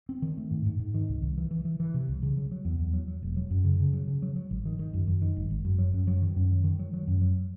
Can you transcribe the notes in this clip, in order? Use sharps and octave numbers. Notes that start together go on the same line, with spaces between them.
C4
D#3
A3
G#2
G#2
G#2
D#3
C2
C2
E3
E3
E3
E3
C3
C2
C#3
F#3
F#3
E2
E2
F#3
F#3
E1
F#3
F#2
C#3
C#3
F#3
C#3
F#3
F#3
G#1
D#3
D#3
F#2
F#2
D#3
G#1
G#1
F#2
F#3
F#2
F#3
D#3
F#2
F#3
D#3
F#3
F#3
F#2
F#3